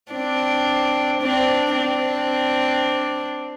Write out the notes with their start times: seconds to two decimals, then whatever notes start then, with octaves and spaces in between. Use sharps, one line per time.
0.12 C4 D4
1.22 C4 D4
1.76 C4 D4